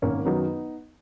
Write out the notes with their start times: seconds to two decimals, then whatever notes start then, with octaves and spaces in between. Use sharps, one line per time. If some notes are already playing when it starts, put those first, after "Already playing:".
0.02 G#1 A#3 C#4
0.25 F#2 D#3 F#3 B3 D#4